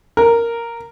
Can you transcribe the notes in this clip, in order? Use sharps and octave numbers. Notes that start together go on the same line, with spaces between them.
A#4